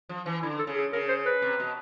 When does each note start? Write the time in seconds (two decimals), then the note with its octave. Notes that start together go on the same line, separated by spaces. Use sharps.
0.09 F3
0.26 E3
0.42 D3 E4
0.59 A4
0.67 C#3
0.76 G#4
0.93 C#3 A#4
1.09 C5
1.26 B4
1.42 C3
1.60 B2